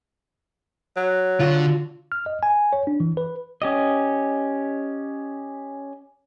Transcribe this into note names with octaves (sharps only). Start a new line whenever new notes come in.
F#3
D3 F4 F#4
F6
D#5
G#5
C#5
D4
E3
B4
C#4 G4 D#5